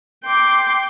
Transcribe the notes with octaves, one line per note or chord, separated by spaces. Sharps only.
G5 C6 D6